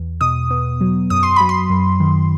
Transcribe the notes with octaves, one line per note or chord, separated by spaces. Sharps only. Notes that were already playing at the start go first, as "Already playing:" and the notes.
Already playing: E2
B2 D#6
B3
F#3
F#2 D#6
C6
F#3 B5
C6
F#2
D#3